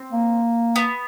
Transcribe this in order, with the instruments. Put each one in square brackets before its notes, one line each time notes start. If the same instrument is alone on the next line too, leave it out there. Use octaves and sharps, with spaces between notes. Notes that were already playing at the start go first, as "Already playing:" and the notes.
Already playing: [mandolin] C4
[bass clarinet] A#3
[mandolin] B3